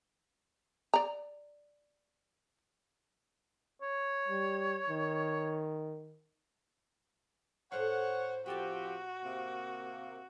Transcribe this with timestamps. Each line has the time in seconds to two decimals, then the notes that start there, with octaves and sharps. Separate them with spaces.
0.94 D5 A#5
3.82 C#5
4.28 G3
4.89 D#3
7.72 A2 A3 C5 C#5 F5 F#5
8.46 F3 C4 F#4 G4 B4 D5 A5
9.23 C3 A#3